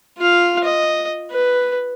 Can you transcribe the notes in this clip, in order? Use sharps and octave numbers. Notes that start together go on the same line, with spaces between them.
F4 F5
D#5
B4